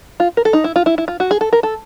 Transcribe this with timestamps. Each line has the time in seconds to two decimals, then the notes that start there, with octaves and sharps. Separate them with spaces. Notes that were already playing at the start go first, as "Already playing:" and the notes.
0.20 F4
0.37 A#4
0.45 A4
0.53 D#4
0.64 E4
0.76 F4
0.86 E4
0.98 E4
1.08 F4
1.20 F#4
1.31 G#4
1.41 A4
1.53 A#4
1.63 A4